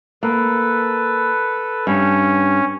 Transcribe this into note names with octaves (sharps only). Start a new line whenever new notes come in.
A#3 A4 B4
G2 C#4